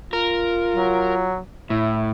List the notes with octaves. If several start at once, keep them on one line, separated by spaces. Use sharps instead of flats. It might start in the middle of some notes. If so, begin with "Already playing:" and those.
F4 A#4
F#3
A2 E4 E5